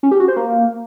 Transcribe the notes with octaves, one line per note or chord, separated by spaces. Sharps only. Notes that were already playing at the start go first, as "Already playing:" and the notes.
C#4
G4
F#4
C5
A#3